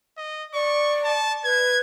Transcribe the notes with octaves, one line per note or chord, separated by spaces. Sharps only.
D#5
D5 C#6
A5
B4 G#6